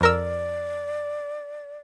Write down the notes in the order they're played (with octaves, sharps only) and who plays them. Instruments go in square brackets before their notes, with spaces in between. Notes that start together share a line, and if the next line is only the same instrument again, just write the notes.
[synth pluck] F2 A#4 E6 [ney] D5